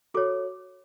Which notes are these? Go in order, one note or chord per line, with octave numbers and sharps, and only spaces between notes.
F#4 A4 C#5 D6